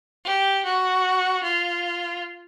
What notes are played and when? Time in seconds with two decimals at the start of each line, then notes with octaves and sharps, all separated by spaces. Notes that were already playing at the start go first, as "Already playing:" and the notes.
0.24 G4
0.65 F#4
1.43 F4